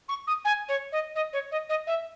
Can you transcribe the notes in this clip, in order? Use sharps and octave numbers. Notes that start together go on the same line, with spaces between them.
C#6
D#6
G#5
C#5
D#5
D#5
C#5
D#5
D#5
E5